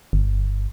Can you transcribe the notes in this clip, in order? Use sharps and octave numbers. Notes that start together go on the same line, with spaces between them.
G1